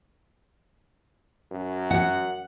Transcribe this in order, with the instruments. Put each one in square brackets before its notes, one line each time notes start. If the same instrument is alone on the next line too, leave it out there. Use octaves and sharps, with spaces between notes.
[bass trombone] F#2
[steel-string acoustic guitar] F#5